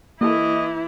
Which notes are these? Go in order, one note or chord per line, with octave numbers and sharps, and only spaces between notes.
E3 A#3 E4 G4 A4 D#5